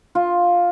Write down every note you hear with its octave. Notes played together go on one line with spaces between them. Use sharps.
F4